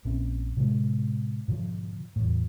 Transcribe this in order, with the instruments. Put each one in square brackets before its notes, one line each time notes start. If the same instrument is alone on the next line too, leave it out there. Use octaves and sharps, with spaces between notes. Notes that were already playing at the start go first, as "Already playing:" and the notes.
[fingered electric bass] A#1 A#2 C4 C#4
A2 C3 G#3
G#2 B2 D3 F3
E2 A2